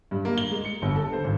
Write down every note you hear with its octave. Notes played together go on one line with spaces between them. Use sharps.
G2
A#3
G7
G#3
C#7
G1
A4
C5
G#1